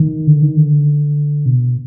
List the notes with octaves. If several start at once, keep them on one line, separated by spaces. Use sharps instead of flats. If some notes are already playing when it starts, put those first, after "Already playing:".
Already playing: D#3
D3
D#3
D3
B2